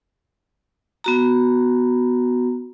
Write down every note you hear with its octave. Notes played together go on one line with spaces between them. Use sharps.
B3 F#4 A#5